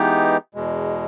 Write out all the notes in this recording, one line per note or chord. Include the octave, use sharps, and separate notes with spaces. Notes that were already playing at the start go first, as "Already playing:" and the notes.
Already playing: E3 G#3 B3 D#4 G4
E2 B2 G#3